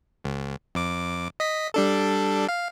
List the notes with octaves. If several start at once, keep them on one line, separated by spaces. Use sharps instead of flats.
C#2
F2 D6
D#5 B6
G3 D4 A4
F5